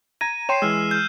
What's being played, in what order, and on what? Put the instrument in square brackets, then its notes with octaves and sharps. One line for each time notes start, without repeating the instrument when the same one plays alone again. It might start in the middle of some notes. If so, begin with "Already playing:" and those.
[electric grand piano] A#5 G#6 A#6 [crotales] D#7
[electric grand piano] C#5 G5 C6 [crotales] C7 E7
[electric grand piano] E3 G#3 [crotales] E6 F6 C7
[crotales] F6 G6